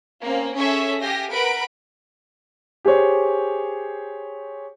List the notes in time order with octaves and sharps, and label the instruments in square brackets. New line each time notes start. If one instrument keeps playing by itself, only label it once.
[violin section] A#3 C4 C#4
C#4 G#4 A4 C#5 E5 C#6
G4 F5 G#5 A#6
A#4 B4 F#5 B5 D7
[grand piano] G4 G#4 C5 C#5